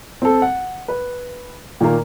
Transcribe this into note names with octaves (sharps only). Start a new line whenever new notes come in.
C4 A4
F#5
B4
A#2 D#3 A#3